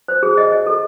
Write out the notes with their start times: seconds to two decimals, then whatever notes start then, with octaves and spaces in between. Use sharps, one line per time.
0.08 C5
0.23 G#4
0.37 D#5
0.52 D#5
0.66 A4